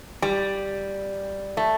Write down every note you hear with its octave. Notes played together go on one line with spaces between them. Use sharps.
G3
A3